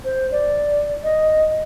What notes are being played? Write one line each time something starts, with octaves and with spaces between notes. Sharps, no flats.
C5
D5
D#5